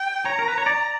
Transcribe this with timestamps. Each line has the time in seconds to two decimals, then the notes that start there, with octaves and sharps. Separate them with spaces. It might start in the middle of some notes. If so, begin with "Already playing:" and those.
Already playing: G5
0.25 C#5 A#5
0.39 A#4
0.48 B4
0.58 C#5
0.66 D5